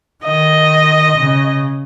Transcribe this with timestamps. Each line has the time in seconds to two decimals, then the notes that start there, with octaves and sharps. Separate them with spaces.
0.24 D#3 D#5
1.17 C#3